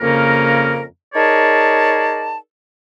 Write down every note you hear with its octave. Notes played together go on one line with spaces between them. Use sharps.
F2 C#3 A#3 C#4 A#4
D#4 G#4 A#4 C#5 D5 A5